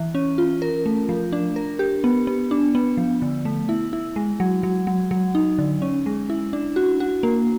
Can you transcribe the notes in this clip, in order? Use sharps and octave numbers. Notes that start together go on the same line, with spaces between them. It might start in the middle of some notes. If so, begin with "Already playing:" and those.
Already playing: E3
C#4
F4
A#4
A3
F3
D4
A#4
G4
B3
B3
D4
B3
F3
D3
A3
E4
E4
G#3
F#3
F#3
F#3
F#3
D#4
D3
C#4
G#3
E4
D4
F#4
F#4
A#3